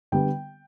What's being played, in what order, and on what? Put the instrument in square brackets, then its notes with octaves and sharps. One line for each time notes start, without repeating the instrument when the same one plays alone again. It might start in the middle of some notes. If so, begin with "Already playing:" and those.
[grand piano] D3 G3 B3 G5